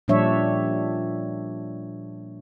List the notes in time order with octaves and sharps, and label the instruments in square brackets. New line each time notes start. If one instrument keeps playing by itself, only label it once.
[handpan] A#2 F3 G3 D4 C#5 E5